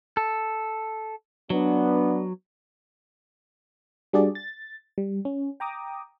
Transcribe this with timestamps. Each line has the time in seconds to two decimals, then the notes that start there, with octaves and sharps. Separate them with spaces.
0.17 A4
1.50 F#3 B3 D4
4.13 G3 D4 F#4 G#4 D5
4.35 A6
4.98 G3
5.25 C#4
5.60 G5 A#5 D6 D#6